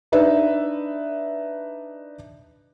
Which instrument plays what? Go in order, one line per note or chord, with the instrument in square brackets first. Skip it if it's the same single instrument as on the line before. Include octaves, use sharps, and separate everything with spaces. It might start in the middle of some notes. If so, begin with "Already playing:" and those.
[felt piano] D4 D#4 B4 E5